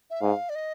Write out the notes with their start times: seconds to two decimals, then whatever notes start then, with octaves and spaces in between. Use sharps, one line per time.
0.10 E5
0.21 G#2 F5
0.49 D5
0.55 D#5